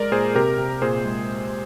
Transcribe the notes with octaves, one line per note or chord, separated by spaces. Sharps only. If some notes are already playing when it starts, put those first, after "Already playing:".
Already playing: G#3 A#4 D5
A#2 G#4 C5
C3 G4 A#4
C3
A#2 G#4 C5
G#3